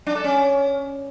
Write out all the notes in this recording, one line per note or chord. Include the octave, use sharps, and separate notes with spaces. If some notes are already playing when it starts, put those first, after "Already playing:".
D4
A4
C#4